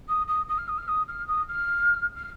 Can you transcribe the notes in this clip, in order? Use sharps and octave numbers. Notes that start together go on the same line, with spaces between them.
D#6
D#6
D#6
F6
D#6
F6
D#6
F6
D#6
F6
F6